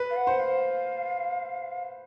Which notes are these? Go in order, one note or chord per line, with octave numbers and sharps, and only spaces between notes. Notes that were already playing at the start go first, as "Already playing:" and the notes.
Already playing: B4
F5
F#5
C5
F5